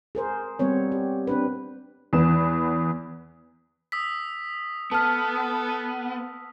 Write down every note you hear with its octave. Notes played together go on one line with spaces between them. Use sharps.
G#4 A#4 C5
G3 B3 C4 C#5
G4
C4 D4 B4
E2 B3 E7
D#6 E6 B6
B3 A4 A5 F6